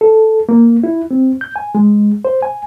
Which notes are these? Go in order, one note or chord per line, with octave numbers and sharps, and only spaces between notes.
A4
A#3
E4
C4
G6
G#5
G#3
C5
G#5